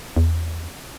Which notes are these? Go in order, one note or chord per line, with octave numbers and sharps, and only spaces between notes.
E2